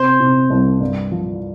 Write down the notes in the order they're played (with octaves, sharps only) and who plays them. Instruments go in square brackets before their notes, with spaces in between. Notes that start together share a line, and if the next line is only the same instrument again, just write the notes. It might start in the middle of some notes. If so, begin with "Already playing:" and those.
Already playing: [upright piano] C3 [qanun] C5
[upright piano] C3
C2
G2
F3